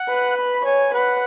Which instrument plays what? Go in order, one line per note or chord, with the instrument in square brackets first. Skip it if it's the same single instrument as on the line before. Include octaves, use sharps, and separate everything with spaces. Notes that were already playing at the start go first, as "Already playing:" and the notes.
Already playing: [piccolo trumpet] F#5
[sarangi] B4
[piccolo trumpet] B5
[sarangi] C#5 [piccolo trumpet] G#5
[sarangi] B4 [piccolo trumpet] F#5